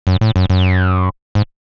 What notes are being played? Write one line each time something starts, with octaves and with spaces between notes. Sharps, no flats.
F#2
A2
F#2
F#2
G#2